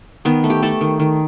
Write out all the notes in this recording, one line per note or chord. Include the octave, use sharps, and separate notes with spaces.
D#3 B3
A3
G4
A3 A4
D#3
D#3